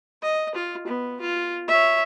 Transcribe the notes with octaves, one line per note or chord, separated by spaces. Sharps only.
D#5
F4
B3
F4
C#5 E5